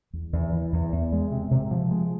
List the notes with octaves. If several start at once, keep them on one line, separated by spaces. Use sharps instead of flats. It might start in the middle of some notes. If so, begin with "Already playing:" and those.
E2
E2
E3
E2
E2
G#3
C3
C3
F3
G#3